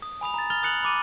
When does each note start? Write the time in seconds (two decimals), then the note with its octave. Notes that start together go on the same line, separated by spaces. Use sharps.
0.02 D#6
0.21 G#5 B5 D#6 F7
0.34 A#5 A6
0.50 B5 F6 A6 F7 G7
0.63 D#6 F#6 C#7 F7 F#7
0.83 B5 D6 D#7